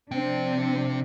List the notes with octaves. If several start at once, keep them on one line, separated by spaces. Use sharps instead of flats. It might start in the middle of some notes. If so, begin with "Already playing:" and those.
C3 F3 C4 D4 G5